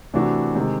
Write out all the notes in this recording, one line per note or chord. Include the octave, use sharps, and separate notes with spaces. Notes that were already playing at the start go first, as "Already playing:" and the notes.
C3 E3 A3 D4 F#4
C3 D#3 G#3